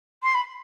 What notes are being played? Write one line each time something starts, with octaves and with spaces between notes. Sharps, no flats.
C6
B5